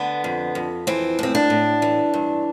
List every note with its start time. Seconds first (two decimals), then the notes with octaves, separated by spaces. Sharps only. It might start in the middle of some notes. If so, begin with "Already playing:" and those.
Already playing: D3 B3
0.24 F2
0.55 F2
0.87 E3 C4
1.19 A2 C4
1.35 D4
1.50 A2
1.82 E3
2.14 G2